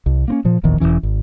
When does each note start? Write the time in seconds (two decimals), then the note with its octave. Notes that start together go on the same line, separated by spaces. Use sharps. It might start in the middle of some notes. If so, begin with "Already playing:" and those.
0.06 C2
0.28 A#3 C4 C#4
0.45 A#2 F3
0.63 D1 A#1 E2 D#3
0.80 E1 B1 E3 C#4
1.03 G#1